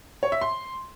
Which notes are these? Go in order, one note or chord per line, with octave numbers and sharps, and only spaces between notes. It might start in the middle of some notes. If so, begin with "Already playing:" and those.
C#5
E5
C6